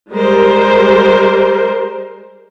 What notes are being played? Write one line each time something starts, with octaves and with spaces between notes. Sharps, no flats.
G3 G#3 A#4 C5